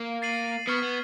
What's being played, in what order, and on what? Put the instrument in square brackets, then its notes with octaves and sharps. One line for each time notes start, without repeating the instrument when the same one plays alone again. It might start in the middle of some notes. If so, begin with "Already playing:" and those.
Already playing: [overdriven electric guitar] A#3
[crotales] A6 C7 D#7 F#7
[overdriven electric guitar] B3 [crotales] C#6 F6 G#6 B6
[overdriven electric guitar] B3